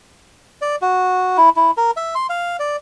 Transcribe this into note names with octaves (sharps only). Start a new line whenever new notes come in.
D5
F#4
E4
E4
A#4
E5
C6
F5
D5